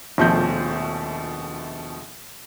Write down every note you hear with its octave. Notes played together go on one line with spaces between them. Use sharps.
D#1 A#1 B2 F3 A3 G6